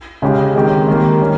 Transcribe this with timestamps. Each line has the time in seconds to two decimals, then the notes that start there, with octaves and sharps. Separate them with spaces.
0.22 C#3 G#3 C#4 G4
0.55 D#3 G#3 C4 G4 A#4
0.87 D#3 G3 A#3
1.20 D#3 A#3 C#4